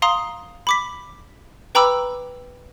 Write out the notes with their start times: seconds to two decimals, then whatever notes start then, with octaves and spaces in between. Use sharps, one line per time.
0.02 F5 A#5 C6 D#6
0.67 B5 D6 B6
1.75 B4 G5 A#5 B5 D6 E6